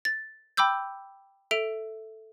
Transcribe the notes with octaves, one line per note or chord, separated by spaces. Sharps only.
A6
G5 B5 D6 E6 G6
A4 E5 D7 F7